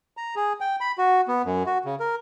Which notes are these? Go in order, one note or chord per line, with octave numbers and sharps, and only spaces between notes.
A#5
G#4
G5
B5
F#4
B3
F#2
F#4
C#3
A#4